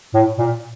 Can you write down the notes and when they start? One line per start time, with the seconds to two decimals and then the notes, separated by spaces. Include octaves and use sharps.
0.14 A2
0.38 A#2